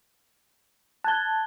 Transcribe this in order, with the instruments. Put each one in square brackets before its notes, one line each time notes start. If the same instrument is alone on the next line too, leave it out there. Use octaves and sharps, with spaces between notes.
[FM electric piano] A5 [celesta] F#6 G#6 G7